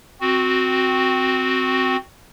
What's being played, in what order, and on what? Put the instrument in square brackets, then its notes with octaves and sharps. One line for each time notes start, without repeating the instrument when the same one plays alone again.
[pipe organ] C4 F#4